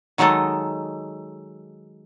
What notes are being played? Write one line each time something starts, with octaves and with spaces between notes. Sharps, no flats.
D#3 F#3 G#3 D#4 A4